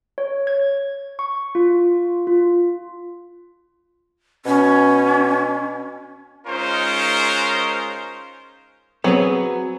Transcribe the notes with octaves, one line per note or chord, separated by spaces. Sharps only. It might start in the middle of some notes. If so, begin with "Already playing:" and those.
C#5
G#6
C#6
F4
F4
B2 C#4
G#3 C#4 D#4 F4 A#4 C5
F#3 B3 C4 G#4